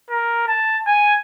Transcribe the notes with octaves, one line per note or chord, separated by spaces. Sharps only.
A#4
A5
G#5